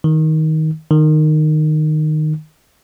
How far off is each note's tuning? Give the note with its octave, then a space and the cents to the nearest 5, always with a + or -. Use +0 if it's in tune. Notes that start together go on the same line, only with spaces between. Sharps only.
D#3 +15
D#3 -15